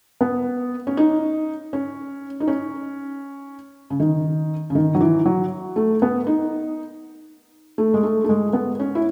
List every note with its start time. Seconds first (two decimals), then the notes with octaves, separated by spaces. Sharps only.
0.21 B3
0.87 C#4
0.97 D#4
1.73 C#4
2.40 D#4
2.48 C#4
3.90 C#3
4.00 D#3
4.70 C#3
4.75 D#3
4.95 F#3
5.01 E3
5.25 F#3
5.76 A3
6.02 B3
6.27 D#4
7.78 A3
7.94 G#3
8.03 A3
8.24 A3
8.29 G#3
8.53 B3
8.80 C#4
8.95 E4